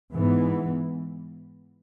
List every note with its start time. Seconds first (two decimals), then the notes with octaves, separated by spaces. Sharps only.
0.12 G#2 E3 B3